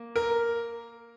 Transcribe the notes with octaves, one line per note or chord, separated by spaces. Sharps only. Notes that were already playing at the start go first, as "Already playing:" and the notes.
Already playing: A#3
A#4